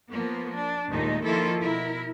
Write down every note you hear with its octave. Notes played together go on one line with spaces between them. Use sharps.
F3 A#3 B3
D4
D#2 A#2 D#3 G#3 A3 D#4
D#3 F3 A#3 E4 F4 A4
B2 E4 A#4